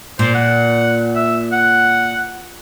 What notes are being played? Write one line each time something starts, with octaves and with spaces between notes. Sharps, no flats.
A#2 C5
F#5
E5
F#5